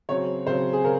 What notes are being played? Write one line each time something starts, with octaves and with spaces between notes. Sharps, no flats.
C#3 F#3 C4 C#5
C#3 F#3 C4 C5
G#4
C#3 A#4